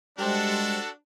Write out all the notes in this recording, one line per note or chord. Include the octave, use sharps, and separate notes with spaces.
G3 G#3 D4 F#4 G4 A4 C5